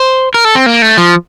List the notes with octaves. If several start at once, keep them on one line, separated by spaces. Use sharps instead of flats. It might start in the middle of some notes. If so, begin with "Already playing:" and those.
Already playing: C5
A#4
A4
C4
A#3
A3
F3